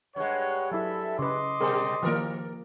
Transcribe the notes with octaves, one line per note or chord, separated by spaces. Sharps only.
G2 G#3 C#5 F#5
F#3 E4 A4 E5
C#3 B4 D#5 C6 D6
B2 G3 G#4 A#4 C5
D#3 F3 A#3 A#4